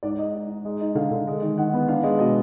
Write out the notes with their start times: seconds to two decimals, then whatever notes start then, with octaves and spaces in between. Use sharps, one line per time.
0.03 G#2 D5
0.18 G#3 D#5
0.34 D#4
0.50 D#4
0.65 G#3
0.81 D#4
0.95 D3 F5
1.11 D3
1.27 G#3
1.42 D#3
1.58 D#3 F#5
1.74 B3
1.88 D4 F5
2.03 G#3
2.19 B2 D#5